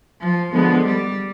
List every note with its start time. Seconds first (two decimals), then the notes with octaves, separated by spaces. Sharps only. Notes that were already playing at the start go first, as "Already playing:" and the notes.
0.20 F3
0.52 D3 F3 G#3 B3
0.85 G3